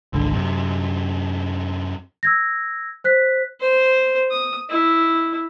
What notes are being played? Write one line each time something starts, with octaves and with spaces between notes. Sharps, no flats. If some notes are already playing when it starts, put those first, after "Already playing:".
G#1 C#2 D3
F#2 C3
E6 G#6 A#6
C5 F#6 B6
C5
D#6
E4